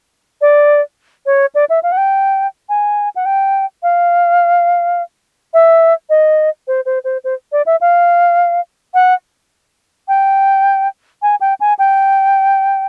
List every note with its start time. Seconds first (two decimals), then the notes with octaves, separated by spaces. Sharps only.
0.41 D5
1.26 C#5
1.55 D5
1.70 E5
1.83 F5
1.92 F#5
1.97 G5
2.69 G#5
3.16 F#5
3.26 G5
3.83 F5
5.54 E5
6.10 D#5
6.68 C5
6.86 C5
7.04 C5
7.24 C5
7.52 D5
7.66 E5
7.81 F5
8.94 F#5
10.08 G5
11.22 G#5
11.41 G5
11.60 G#5
11.79 G5